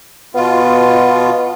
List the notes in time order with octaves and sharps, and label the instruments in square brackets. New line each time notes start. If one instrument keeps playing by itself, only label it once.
[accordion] B2 F4 [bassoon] B3